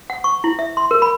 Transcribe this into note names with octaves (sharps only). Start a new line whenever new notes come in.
F#5
C#6
E4
E5
C6
A#4
B5